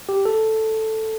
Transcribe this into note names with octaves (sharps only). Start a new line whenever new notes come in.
G4
A4